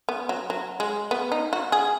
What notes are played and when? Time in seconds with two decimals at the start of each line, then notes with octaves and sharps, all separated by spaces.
0.09 B3
0.29 F#3
0.50 F#3
0.80 G#3
1.11 B3
1.32 D#4
1.53 F#4
1.72 G#4